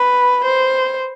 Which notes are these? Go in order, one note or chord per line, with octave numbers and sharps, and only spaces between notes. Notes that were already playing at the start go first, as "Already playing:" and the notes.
Already playing: B4
C5